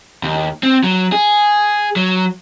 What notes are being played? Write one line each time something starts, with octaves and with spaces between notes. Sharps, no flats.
D#2
C4
F#3
G#4
F#3